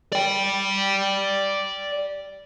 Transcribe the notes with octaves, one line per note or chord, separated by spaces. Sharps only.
D5 G5